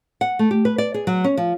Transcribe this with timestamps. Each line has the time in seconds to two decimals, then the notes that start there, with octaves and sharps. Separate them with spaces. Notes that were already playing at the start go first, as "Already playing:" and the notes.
0.21 F#5
0.39 A3
0.51 G4
0.65 B4
0.78 D5
0.94 G#4
1.07 F#3
1.24 C#4
1.37 F3